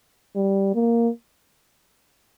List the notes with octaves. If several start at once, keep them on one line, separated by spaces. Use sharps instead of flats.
G3
A#3